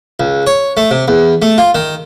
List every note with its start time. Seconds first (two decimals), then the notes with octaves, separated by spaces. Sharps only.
0.20 C#2
0.47 C#5
0.77 A3
0.91 C3
1.08 E2
1.42 A3
1.58 F4
1.75 D#3